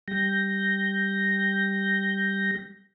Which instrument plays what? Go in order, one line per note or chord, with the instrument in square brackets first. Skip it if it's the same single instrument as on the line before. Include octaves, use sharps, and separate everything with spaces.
[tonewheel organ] G3 G6 A#6